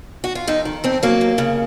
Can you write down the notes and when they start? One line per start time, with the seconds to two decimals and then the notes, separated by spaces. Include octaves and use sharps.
0.24 F#4
0.35 F4
0.47 F2 D#4
0.65 D#3
0.84 F2 C4
1.03 F#3 A#3
1.21 D#2
1.38 C#3